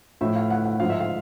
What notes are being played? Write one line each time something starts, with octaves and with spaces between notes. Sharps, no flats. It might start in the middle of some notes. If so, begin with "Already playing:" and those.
A2 F3 E5
F5
F#5
F#5
G#2 F3 F5
E5
F5